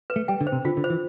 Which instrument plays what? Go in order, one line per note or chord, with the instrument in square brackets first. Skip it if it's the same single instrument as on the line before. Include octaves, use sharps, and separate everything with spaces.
[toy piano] B4
[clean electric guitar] A3
[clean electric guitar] G3 [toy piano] G5
[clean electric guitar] D3
[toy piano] C5
[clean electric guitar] C3
[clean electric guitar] D3 [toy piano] F4
[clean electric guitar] D3
[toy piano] C5
[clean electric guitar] E3